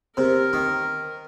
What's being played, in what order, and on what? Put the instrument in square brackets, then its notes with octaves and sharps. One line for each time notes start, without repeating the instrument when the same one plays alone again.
[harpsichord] C3 [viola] A#4
[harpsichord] D#3